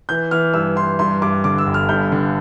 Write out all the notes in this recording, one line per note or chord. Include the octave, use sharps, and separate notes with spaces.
E3 G6
E3 F6
G2 E6
E3 C6
G2 C6
G2 D6
D3 D6
E6
G1
F6
G2 G6
D3